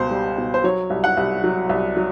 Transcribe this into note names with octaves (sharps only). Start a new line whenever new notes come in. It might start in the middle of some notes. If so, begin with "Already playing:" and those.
Already playing: C#2 B2 G3 C5
G3
B2
C5
F#3 C#5
C2
F#5
C2
F#3
C2
F#3